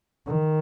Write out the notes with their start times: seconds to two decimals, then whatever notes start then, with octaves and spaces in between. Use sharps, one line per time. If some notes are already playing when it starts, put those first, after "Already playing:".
0.26 D#3